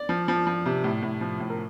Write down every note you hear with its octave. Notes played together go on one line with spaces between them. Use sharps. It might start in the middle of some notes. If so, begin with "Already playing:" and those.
Already playing: D5
F3
F3
F3
C3
A2
A2
F3
A2
A#4